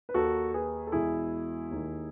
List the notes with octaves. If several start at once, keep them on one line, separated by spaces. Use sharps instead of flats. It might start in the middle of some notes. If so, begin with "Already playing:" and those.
B4
D#2 D#3 F#4 A4
G#4 B4
A4
E1 E2 B2 E4 G#4
D#2 D#3